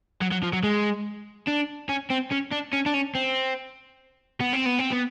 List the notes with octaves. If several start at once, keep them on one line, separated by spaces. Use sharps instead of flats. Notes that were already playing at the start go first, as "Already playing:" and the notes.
F#3
F#3
F3
F#3
G#3
D4
C#4
C4
C#4
D4
C#4
D4
C#4
C4
B3
C4
B3
C4
B3